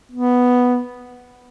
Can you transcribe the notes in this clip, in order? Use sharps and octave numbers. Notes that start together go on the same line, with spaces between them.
B3